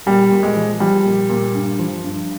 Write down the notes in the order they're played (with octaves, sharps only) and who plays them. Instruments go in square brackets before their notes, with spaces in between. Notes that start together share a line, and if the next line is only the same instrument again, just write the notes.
[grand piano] A#2 G3
A#2
G#3
F3
F3 G3
A#2
A#2
G2
F3
G2